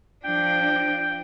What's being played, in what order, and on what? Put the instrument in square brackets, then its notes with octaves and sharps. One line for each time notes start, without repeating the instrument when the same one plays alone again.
[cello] F3 D4 [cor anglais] G5